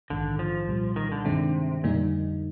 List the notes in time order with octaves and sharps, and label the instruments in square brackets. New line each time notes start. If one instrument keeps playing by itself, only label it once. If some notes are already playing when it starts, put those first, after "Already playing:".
[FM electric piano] A#1 G#2 D#3 [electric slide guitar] D3
[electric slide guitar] F3
[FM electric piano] C2 A#2 G3
[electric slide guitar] D#3
D3
[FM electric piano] G2 D#3 G#3 D4 [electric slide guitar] C3
[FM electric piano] F2 D3 G3 A#3 D#4 [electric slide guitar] A#2